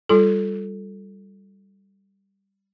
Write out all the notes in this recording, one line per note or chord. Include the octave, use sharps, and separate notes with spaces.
G3 F4 A4